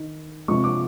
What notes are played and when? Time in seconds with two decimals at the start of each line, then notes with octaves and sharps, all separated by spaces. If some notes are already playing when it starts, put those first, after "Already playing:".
Already playing: D#3
0.48 C3 F3 G#3 C#6
0.64 D6